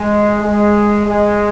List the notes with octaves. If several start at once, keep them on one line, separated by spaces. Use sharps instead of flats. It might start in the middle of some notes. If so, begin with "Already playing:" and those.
Already playing: G#3
G#3
G#3